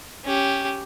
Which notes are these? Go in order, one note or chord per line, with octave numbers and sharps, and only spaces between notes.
C#4 G4